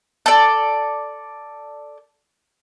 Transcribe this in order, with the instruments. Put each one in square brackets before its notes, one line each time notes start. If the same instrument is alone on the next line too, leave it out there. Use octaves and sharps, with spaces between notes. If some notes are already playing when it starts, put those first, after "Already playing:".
[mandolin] A4 D5